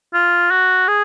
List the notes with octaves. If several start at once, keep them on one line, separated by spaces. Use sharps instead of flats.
F4
F#4
G#4